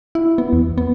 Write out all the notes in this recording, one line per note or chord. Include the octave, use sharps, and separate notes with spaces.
E4
B3
E2
B3